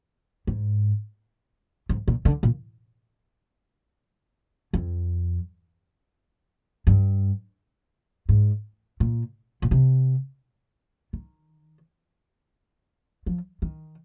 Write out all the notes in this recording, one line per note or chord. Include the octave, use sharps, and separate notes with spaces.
G#2
G#2
A#2
D3
A#2
F2
G2
G#2
A#2
A#2
C3
D#3
F3
D#3